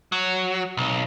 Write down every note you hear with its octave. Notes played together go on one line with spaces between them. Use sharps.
F#3
B1